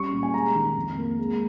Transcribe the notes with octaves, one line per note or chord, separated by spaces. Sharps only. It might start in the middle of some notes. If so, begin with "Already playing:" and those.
Already playing: G3 C#4 C#6
A#2
G#5
G#3 A#5
D#3
F2
A#3
G#3